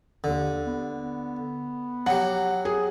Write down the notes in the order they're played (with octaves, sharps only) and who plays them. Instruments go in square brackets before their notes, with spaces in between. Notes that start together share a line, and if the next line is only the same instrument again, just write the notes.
[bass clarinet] D#2 [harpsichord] D3
[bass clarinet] B3
[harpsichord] F#3 G4 [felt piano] F#5
[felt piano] G#4